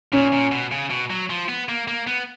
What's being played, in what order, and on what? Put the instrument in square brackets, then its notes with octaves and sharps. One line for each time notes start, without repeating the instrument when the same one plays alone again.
[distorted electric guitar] A#2 [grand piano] C#4
[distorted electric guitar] A#2
B2
C#3
B2
F#3
F3
B3
A#3
A#3
B3